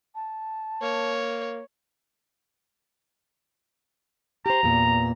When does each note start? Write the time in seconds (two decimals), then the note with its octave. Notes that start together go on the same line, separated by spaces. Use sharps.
0.15 A5
0.82 A#3 C#5
4.46 G4 C5 A#5
4.63 E2 A#2